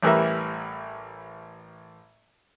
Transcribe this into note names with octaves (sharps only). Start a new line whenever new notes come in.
A1 A2 E3 G3 A#4 E5